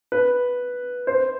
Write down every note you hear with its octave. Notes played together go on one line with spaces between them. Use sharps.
B4
C5